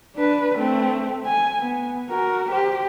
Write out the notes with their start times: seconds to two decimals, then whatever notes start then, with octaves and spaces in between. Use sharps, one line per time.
0.16 D4 B4
0.57 A3 C4
1.26 G#5
1.59 B3
2.10 F#4 A#4
2.51 G4 C5